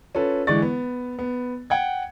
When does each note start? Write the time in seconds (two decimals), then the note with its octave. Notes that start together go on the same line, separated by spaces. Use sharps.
0.15 C#4 F4 A4 B4
0.47 D3 E3 G#3 D5 C#6 A6
0.62 B3
1.19 B3
1.70 F#5 G5 G#6